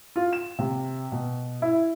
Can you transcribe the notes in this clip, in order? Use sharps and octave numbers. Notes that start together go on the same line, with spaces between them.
F4
E7
C3
B2
E4